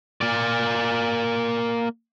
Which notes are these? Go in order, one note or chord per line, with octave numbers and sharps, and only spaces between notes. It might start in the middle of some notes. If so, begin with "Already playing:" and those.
A#3 D5